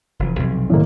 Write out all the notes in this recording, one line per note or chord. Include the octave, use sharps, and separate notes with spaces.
F1 E3
B1 F2 C3
A2 D#3 A#3